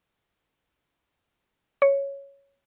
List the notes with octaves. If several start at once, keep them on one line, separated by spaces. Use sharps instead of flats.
C#5